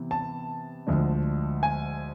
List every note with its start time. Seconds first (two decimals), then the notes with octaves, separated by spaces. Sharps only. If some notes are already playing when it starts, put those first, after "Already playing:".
Already playing: C3 E3 B3
0.11 A5
0.87 D2 D3 F3 G#3 D4
1.63 G#5